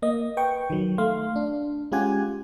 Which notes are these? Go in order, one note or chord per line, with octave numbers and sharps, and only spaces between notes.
A#3 D#5
B4 G5 C#6
D#3 F#3
A3 F5 C6
D4
G#3 C#4 F4 G4 F#5 G#5